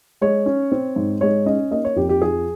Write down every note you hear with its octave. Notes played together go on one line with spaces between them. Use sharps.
G#3 C#5
C#4
C4
G#2
G#3 C#5
C#4 D#5
A#3 D#5
C#5
F2 G4
G4
F3 G#4